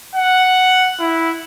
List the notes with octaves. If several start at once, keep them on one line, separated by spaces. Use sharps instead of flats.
F#5
E4